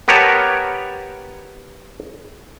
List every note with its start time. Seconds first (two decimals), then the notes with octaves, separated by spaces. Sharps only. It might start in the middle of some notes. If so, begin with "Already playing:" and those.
0.08 B3 G4 A#4 B4 C#5 A5